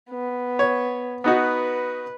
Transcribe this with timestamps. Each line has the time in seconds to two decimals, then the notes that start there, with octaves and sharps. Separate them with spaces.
0.10 B3
0.59 C#5
1.24 B3 D#4 F#4 B4